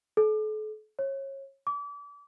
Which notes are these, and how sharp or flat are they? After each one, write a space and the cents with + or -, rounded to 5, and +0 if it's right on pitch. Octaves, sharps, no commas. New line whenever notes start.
A4 -40
C#5 -30
D6 -35